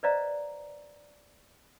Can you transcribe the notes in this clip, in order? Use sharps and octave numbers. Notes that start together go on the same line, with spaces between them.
B4 C5 D5 D#5 F5 A#5